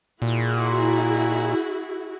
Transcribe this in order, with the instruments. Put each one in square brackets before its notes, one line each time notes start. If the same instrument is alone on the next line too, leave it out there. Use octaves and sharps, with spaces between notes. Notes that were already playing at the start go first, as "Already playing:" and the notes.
[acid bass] A#2 [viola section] E4 F#4 G#4